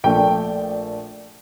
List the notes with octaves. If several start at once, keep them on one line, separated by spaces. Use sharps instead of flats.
A#1 A#2 A3 G5